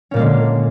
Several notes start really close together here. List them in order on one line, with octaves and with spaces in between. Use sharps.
C#4 A#2 A#3 G#3 D3